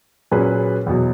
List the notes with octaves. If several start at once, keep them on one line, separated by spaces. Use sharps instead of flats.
A#2 F#3 C#4 G#4 B4
E2 B2 F#3